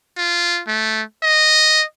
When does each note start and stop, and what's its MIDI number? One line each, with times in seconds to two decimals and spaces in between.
0.17 0.61 65
0.68 1.03 57
1.23 1.84 75